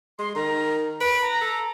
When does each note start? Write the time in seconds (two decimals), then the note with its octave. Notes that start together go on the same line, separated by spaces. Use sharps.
0.19 G#3 C6
0.35 D#3 A#5
1.01 B4 D7
1.22 A#5
1.41 A4